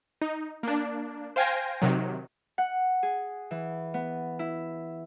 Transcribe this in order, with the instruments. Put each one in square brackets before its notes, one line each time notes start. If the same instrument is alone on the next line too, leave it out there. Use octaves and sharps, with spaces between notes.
[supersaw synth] D#4
A#3 D4
C5 F5 G5 G#5 G#6 A#6
C3 D#3 F#3
[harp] F#5
G#4
E3
B3
E4